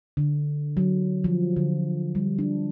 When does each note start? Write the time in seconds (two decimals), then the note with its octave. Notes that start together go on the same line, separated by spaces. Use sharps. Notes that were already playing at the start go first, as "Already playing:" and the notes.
0.17 D3
0.77 F#3
1.24 F3
1.56 D3
2.15 G3
2.39 D4